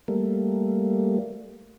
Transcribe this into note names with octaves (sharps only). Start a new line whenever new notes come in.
G3 A3 A#3